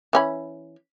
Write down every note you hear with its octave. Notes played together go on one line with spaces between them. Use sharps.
E3 C#4 B5